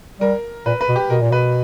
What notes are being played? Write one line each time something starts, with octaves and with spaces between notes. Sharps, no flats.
G3 A#4
A#2 B4
B4
B2
G4
B2 A#4
A#2
B2 B4